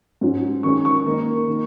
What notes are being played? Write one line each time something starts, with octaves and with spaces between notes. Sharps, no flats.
G#2 F#3 C#4
D#3 G#3 C#4 C#6
C#6
D#3 A#3 D#4
D#3 A#3